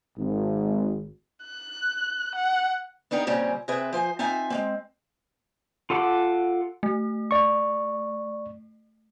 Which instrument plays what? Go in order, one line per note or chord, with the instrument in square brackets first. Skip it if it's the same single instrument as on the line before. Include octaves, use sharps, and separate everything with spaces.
[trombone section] G#1
[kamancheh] F#6
F#5
[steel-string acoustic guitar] B3 D4 D#4 G4 A#4
A#2 C#3 G3 C4 C#4
C3 C4 G#4 B4 E5
F3 C5 G#5
C4 D#4 F4 E5 G#5
G#3 A#3 C4
[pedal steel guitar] F4 A4 F#5 D6
[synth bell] A3
[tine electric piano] D5 C#6